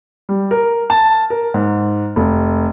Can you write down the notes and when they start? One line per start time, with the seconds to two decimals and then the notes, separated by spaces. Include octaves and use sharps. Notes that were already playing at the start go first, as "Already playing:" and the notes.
0.29 G3
0.51 A#4
0.90 A5
1.30 A#4
1.54 G#2
2.16 F1